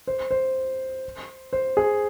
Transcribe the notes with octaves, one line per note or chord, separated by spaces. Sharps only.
C5
C5
C5
G#4